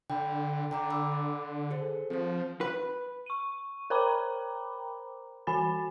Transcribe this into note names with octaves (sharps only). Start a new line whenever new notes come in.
D3 G5 B5
D3 G5 A#5 D6
B5 D6 E6
G#4 A4 C5
F3 C4 C5
B4
C#6 D#7
A#4 C5 G5 A#5 B5 D6
E3 F#4 G#5 B5 A6